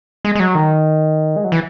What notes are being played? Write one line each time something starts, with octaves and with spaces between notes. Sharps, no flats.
G#3
G#3
F#3
D#3
G#3
F#3
E3